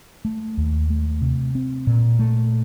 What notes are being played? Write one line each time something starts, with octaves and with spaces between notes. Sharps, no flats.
A3
D#2
A3
C3
C4
A#2
A3